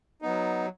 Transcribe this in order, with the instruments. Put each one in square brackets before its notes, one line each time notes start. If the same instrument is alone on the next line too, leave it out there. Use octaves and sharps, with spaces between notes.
[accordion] F#3 B3 D#4